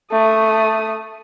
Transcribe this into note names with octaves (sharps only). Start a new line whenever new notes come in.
A3 D#6